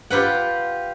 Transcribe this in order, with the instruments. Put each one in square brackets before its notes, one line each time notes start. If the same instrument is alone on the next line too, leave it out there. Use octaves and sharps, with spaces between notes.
[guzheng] F4 G4 B4 F#5